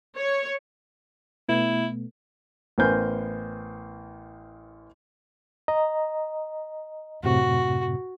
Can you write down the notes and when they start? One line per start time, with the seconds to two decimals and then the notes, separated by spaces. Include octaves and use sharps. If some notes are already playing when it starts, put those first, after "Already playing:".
0.16 C#5
1.48 B2 A3 B3 E4
2.78 A1 B3 A#4 C5 G#5 G6
5.68 D#5 A#5
7.23 F#2 A2 C3 F#4